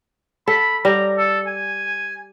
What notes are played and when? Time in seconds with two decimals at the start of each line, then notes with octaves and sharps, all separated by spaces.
0.48 A4 B5
0.85 G3 A#5
1.17 A4
1.47 G#5